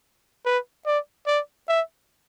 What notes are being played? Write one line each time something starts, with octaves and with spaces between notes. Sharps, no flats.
B4
D5
D5
E5